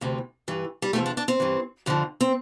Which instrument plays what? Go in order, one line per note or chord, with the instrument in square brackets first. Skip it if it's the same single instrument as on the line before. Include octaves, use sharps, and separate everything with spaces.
[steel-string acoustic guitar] D2 C3 E3
G2 E3
G3
E2 C3 F3 A3
D4
D4
C4
G2 E3
F2 D3 F3
C4